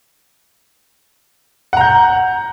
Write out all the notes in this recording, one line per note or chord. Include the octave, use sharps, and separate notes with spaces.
F#5 A#5 G6